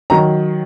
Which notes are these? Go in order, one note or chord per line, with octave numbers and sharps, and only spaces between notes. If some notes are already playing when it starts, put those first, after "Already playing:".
D#3 F#3 A#5